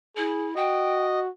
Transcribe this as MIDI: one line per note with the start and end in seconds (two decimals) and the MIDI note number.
0.17 0.56 64
0.17 0.49 68
0.56 1.30 66
0.56 1.20 75
0.56 1.05 79